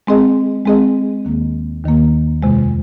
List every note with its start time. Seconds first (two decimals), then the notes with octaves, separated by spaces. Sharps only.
0.07 G#3 C4 G#4 D#5
0.66 G#3 C4 G#4 D#5
1.25 D#2 D#3 A#3
1.84 D#2 D#3 A#3
2.42 F2 C3 G#3